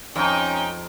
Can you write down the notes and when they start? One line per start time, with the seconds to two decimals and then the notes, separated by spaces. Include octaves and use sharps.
0.16 F2 C#4 D#4 G5